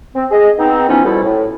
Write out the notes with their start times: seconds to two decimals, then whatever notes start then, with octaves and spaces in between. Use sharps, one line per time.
0.14 C4
0.31 G#4 D#5
0.58 B3 C4 D#4
0.88 E3 F3 B3 C#4 D#4
1.05 B2 F3 G3 E4 F#4 A4
1.23 A2